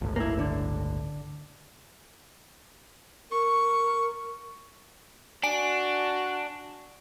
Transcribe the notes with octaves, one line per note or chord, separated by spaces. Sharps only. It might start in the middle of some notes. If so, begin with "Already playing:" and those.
G1 C#2 A2
A#3 E4
D3
A#4 C#6
D4 F#4 G#5 D7